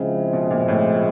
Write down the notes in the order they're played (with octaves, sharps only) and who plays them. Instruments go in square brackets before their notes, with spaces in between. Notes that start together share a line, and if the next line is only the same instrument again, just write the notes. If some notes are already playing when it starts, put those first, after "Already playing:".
Already playing: [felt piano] C#3 [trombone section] F3 G#3 C4 E4 G#4
[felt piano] B2
A#2
A2